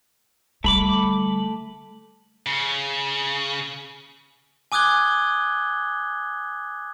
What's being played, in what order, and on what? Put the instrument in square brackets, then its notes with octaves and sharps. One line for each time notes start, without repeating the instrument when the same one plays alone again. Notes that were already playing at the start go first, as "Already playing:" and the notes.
[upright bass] D3 G3 [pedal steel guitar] A3 B5 D6
[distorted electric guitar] C#3
[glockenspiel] G#5 D6 D#6 F#6 G#6 G7